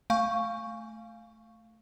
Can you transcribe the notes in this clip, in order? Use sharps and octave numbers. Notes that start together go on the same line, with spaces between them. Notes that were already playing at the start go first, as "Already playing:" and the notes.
A3 F5 G#5 C#6